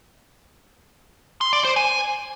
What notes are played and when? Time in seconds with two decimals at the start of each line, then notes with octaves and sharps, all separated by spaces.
1.41 C6
1.53 D5
1.65 C5
1.76 G#5